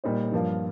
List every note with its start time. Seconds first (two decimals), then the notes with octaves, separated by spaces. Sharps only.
0.04 A#2 G3 D#4 C5
0.32 G2 F3 A#3 F4